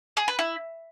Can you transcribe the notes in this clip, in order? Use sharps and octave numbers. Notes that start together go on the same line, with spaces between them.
G#4
B4
E4